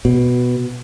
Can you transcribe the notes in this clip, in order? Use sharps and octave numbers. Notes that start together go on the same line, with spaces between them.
B2